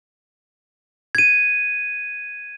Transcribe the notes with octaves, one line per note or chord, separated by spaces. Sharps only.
G#6 D#7